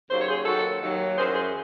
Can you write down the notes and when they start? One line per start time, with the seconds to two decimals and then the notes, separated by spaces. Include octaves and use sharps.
0.10 D#2 C#3 F#3 C5
0.19 C#5
0.28 G#4 C5
0.45 D#2 D#3 F#3 F#4 A4
0.81 D#2 D#3 F#3
1.17 F#2 G#4 C5
1.20 E3
1.35 G#4 C5